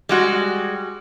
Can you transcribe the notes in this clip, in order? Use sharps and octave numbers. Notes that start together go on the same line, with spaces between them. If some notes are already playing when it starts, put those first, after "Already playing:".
G3 G#3 F#4